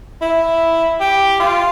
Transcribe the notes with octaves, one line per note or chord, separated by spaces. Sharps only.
E4
G4
F4